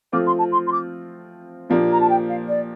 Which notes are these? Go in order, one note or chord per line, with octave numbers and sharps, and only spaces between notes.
F3 A3 C4 F4 D6
C6
A5
C6
C6
D6
A#2 F3 A#3 D4 G4
A#5
A5
G5
F5
D5